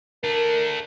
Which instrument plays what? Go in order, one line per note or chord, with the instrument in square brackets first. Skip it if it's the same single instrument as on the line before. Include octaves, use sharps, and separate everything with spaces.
[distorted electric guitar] A3 D4 [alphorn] A#4